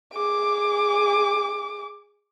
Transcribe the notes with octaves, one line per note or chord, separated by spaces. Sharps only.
G#4 D6